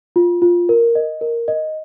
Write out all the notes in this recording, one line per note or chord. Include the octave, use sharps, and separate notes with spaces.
F4
F4
A#4
D#5
A#4
D#5